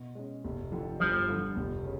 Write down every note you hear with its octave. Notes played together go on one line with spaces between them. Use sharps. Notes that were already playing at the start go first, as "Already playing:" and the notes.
Already playing: B2
G#3 C#4
F1
F2 D3 F3
G1 F3
G2 D3
F1
C#3